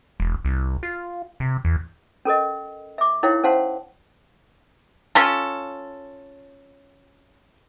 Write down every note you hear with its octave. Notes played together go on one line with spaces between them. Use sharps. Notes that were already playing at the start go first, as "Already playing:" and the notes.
E1
C2
F4
C3
E2
C#4 A4 A#4 D#5
E5 D6
D#4 E4 A#4 C#5 F5 G5
C#4 C5 F5 F#5 A5 C6
C#4 F4 A4